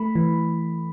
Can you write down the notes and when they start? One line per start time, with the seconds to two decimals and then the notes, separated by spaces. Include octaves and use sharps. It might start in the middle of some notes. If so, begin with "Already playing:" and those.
Already playing: A3 B5
0.15 E3